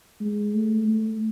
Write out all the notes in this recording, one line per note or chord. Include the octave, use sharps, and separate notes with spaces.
G#3
A3
A3